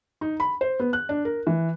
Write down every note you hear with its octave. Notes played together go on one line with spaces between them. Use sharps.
D#4
B5
C5
B3
F#6
D4
A#4
E3